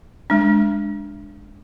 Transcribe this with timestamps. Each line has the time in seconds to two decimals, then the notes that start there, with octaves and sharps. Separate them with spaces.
0.30 G#3 D4